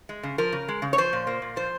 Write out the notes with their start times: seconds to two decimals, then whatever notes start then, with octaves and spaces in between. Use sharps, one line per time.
0.09 G#3
0.23 C#3
0.38 F3 A#4
0.52 C#3
0.68 G#3
0.82 C#3
0.93 C#5
0.98 F3 C5
1.13 A#2
1.27 A#3
1.42 A#2
1.56 F3 C5